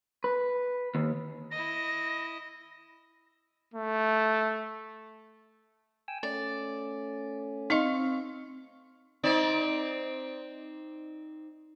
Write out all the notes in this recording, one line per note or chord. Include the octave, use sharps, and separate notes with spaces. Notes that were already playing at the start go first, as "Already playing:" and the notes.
B4
D#2
E4 D#5 A#6
A3
G5 G#5 E6
A3 C#4 D5
C4 D#4 D#5 F5 C6 C#6
C4 D#4 D5